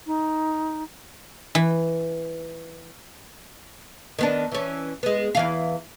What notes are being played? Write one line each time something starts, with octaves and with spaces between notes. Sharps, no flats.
D#4
E3
D#3 B3 D4
E3 C#4
G#3 B3
E2 E3 F5